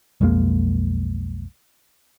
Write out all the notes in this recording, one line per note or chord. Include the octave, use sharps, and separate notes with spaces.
B1 F2 G#3 A#3